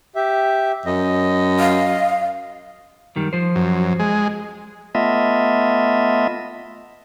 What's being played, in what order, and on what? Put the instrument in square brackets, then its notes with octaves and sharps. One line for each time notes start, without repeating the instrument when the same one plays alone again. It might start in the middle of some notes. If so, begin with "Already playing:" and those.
[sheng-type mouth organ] G4 E5
[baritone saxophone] F#2 [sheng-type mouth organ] D#5
[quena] F5
[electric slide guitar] F#2 D#3 G3
F3 C5
[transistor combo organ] F#2
G#3
[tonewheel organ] A3 B3 F4 D#5 E5